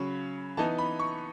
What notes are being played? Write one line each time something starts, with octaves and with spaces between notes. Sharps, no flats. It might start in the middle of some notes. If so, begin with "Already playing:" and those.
Already playing: C#3 F#3 C#4 B5
E3 B3 D#4 A5
B5
C#6